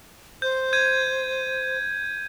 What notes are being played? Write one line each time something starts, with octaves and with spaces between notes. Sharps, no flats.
C5 G6
G6 G#6 D#7